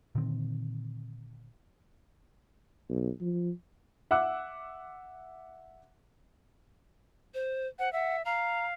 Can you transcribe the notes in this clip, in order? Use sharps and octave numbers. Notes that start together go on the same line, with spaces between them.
A#2 D3 D#3 C4
B1
F3
E5 F#5 D6 E6 F#6
C5
C5 F#5
E5 F#5
F5 A#5